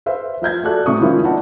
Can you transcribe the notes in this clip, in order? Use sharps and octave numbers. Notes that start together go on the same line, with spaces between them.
B4 C5 E5 F5
F3 E5 G6 G#6
F#4 G#4 A4 D5 A5 F#6
A2 C3 C#6 D#6
D#3 F3 G#3 C#4 E4 F4
B3 D#4 E4 D5 F#5 A5